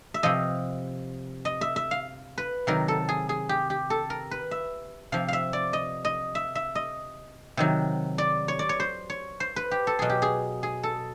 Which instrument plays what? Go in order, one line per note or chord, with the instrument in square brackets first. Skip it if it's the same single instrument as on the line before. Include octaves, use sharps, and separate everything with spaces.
[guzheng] E5
C3 F3 D#5
D#5
E5
E5
F5
B4
C3 D#3 F#3 A#4
A4
G#4
G#4
G4
G4
A4
A#4
B4
E5
C3 F3 F5
E5 F5
D5
D#5
D#5
E5
E5
D#5
C3 D#3 F#3
D5
C#5
D5
C#5
C5
C#5
C5
B4
G4
A4
B2 F#3 G#4
G4
G#4
G#4
A4